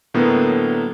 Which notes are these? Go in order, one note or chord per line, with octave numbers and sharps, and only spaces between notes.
A2 D3 F#3 A#3 B3